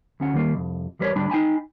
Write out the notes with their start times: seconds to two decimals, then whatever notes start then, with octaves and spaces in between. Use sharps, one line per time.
0.20 D2 C#4 F#5
0.34 D#3 G3 A#3
0.54 C2 F2
0.99 E2 G3 A#4 B4 C#5
1.15 D2 G#2 G3 D4 B5
1.30 D#4 G5 G#5 B5